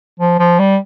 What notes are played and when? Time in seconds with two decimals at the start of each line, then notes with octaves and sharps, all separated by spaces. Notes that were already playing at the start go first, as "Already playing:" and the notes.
0.20 F3
0.39 F3
0.59 G3